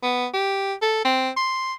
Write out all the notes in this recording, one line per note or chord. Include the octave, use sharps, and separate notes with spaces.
B3
G4
A4
C4
C6